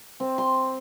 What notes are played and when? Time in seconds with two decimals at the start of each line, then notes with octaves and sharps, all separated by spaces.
0.20 C4
0.38 C6